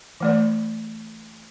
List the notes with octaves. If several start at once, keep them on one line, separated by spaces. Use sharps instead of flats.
E3 A3 D5